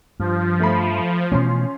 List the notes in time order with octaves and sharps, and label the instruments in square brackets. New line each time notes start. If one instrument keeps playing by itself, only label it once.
[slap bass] G2 [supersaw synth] F3
[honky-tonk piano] A3 B5
[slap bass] B2 E3 A3 [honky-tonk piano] C#4 C6